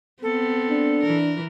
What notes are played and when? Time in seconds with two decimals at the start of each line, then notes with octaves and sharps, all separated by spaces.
0.23 B3 C4 A4
0.70 D4
1.03 E3 A#4